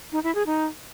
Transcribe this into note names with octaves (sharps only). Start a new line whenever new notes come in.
D#4
E4
G#4
D#4